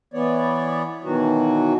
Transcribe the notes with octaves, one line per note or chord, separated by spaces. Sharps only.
E3 B3 C#5 D5
B2 D#3 E3 F#3 F#4